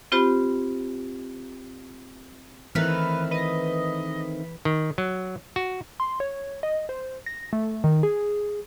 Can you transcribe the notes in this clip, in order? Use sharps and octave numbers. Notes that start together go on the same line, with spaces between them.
C4 F4 G4 C5 B5
D#3 E3 A3 C4 B4 F6
B4 D#5
D#3
F#3
F#4
C6
C#5
D#5
C5
A#6
A3
D#3
G#4